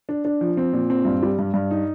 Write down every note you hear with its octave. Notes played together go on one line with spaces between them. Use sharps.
D4
D4
F3
C4
A#2
C4
G2
G3
G2
G2
D#4